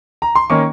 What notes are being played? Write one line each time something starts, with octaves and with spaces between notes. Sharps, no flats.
A#5
C6
D#3 A#3 C#4 C#6